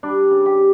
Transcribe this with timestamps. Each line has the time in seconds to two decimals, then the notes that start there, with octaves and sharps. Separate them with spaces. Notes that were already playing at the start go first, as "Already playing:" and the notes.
0.03 G3 D4
0.31 C#3
0.46 G4